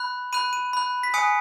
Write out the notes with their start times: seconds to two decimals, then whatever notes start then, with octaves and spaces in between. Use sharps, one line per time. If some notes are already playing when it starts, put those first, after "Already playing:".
Already playing: B5 F#6
0.33 B5 F#6 D#7
0.53 D#7
0.73 B5 F#6
1.03 B6
1.14 G#5 D#6 F#6 C#7